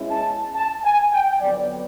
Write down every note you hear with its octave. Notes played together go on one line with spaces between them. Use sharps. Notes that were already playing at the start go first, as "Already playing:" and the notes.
Already playing: B2 G#3 C#4 E4
A5
A5
G#5
G5
F2 D3 F#3 B3 D5